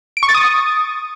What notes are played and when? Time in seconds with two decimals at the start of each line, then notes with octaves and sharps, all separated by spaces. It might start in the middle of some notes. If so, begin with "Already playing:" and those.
0.17 D7
0.23 C#6
0.29 A6
0.34 D#6